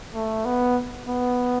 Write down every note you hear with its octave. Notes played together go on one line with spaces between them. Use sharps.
A3
B3
B3